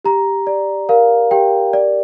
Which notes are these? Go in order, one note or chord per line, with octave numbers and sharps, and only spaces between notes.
G4 A#5
D5
A#4 F5
G4 G5
D5